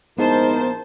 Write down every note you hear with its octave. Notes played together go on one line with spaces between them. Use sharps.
A#1 G#2 B3 E4 A#4 C5 A5